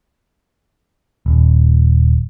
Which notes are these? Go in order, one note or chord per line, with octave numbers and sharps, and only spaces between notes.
D#1